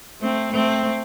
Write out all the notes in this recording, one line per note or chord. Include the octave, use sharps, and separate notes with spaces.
A3 C4
A3 C4